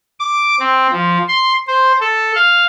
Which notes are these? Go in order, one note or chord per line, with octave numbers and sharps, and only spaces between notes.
D6
C4
F3
C6
C5
A4
F5